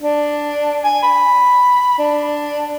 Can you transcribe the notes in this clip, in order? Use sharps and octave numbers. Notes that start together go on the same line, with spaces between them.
D4
G#5
B5
D4